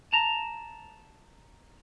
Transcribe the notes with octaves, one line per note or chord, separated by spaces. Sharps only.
A5 A#5